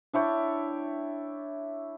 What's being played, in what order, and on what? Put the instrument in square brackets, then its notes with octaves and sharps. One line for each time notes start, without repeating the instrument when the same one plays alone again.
[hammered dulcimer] D4 E4 C#5 G5